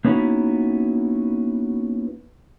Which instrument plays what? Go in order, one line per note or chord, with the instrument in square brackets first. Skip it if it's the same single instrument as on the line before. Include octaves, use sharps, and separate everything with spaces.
[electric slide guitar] A#3 B3 C#4 D#4 E4 F#4